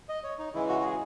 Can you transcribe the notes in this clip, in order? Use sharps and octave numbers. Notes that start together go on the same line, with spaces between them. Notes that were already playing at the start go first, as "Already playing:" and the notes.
D#5
C#5
D#4
C#3 E3 G#3 E4
F#4
F#4
G#4